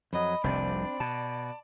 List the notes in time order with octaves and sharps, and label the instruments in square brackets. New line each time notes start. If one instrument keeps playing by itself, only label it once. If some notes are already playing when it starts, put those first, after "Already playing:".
[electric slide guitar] F2 F#3 [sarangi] D#5 [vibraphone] B5
[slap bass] F1 C2 C3 [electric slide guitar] C4 D4 [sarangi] D5
[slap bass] B2 [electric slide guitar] A5